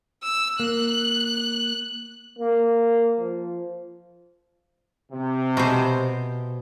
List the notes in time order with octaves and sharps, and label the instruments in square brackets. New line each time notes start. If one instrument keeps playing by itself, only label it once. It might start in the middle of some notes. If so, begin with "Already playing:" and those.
[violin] E6
[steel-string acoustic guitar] A#3 [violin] F#6
[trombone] A#3
F3
[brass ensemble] C3
[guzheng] B2 C5